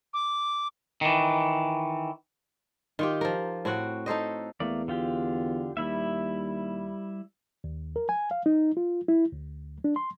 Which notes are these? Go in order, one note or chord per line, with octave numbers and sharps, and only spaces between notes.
D6
D#3 E3
D#3 F4 G4
F3 A#4
A2 C4 F#4 F#5
D#4 A4 C5 D#5
E2 A3 A#3 D5
D3 F4 G4
D#2 G3 E4 E5
D#2
A#4
G#5
F5
D#4
F4
E4
D2
D4
C6